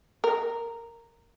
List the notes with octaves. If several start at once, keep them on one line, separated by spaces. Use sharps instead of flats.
A#4